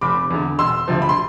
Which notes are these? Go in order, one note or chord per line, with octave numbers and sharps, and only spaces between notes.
F1 B5 D6
E2 D3
E1 C6 E6
D2 C3 F3
B5
C6